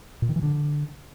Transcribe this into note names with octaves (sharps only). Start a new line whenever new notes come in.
A#2
D#3
E3
D3